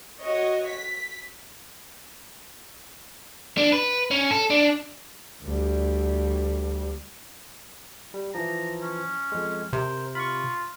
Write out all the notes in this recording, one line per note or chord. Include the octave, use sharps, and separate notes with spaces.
F#4 C#5 D#5
B6
D4
B4
C#4
A4
D4
D2 G3
G3
E3 F3 A#5
C#4
F2 G#3
C3 A#4 C5
F4 B5 C#6